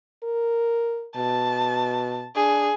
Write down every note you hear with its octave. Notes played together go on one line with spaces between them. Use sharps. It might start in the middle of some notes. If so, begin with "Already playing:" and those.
A#4
B2 A5
D4 G#4